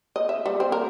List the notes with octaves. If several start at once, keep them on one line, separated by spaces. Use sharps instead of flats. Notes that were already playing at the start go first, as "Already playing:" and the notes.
D#5
E5
G3
C4
A#4